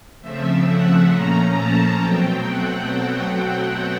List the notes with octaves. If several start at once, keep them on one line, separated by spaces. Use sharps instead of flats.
C#3 F3 A3 C4 E5
F#5
A#2 F3 A3 C#4 A#5
A5
B2 F#3 A3 C4 G5
F#5